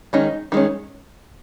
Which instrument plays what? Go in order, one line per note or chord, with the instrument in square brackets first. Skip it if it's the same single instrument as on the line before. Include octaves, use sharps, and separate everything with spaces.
[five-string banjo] D#3 G#3 C#4 D#4
D#3 G#3 C#4